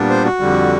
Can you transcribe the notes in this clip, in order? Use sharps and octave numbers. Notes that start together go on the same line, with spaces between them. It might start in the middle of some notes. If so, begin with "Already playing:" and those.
Already playing: A#2 G3 B3 D4
C5
F#4
F2 D3 G3